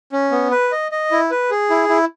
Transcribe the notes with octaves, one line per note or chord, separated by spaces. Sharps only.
C#4
B3
B4
D#5
D#5
E4
B4
G#4
E4
E4